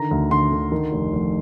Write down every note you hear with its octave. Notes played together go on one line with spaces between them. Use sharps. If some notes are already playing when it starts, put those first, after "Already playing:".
Already playing: D3 D#3 A#5
D2
D3 C6
D3
D#3
F1
F1